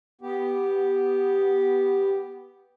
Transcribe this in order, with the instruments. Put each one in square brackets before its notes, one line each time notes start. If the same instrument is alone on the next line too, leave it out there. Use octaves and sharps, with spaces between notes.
[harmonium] B3 G4